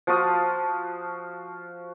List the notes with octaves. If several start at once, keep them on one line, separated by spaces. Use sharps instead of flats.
F3 F4 F#4 D#6